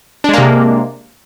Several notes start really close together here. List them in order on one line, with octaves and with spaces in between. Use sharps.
D4 G#3 A#3 C3